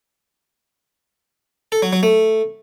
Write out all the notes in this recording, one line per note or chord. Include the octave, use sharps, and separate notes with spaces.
A4
F#3
F#3
A3